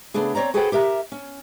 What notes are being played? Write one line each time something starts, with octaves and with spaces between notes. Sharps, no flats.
C#3 A3 B3 D4 G#4
C4 C#5 D5 A#5
F#4 G#4 A4 B4 C5 G5
G4 A#4 E5 A#5
C#4